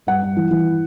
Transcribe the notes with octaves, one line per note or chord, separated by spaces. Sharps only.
G2 F#5
G2
E3
E3